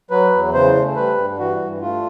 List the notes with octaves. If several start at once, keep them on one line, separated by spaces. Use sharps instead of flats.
F#3 B4
E2
C#3 C5
A3
G3 B4
G2
E3 F#4
G2
A3 F4